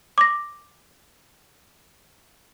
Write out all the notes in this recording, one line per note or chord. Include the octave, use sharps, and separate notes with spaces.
D6 A#6